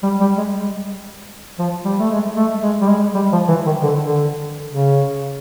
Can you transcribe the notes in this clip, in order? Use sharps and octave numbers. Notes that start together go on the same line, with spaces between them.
G3
G3
G#3
F3
G3
A3
G#3
A3
G#3
G3
G#3
G3
F3
E3
D#3
D3
D3
C#3